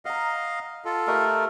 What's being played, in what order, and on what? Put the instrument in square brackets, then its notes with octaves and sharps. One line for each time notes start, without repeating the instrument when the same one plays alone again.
[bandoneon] D#5 F5 [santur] F#5 A#5
[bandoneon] F4 A4
[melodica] A3 A#4 [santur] G4 D#5 E5